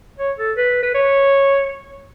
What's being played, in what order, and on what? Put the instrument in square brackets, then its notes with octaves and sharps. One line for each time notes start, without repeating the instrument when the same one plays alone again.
[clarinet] C#5
A4
B4
B4
C#5